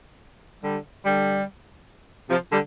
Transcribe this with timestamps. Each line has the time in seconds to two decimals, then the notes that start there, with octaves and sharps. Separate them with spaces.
0.63 D3 G3
1.04 D3 G3
2.29 C3 F3
2.50 D3 G3